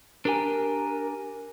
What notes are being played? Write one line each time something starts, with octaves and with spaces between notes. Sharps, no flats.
D4 G4 A#4 G#5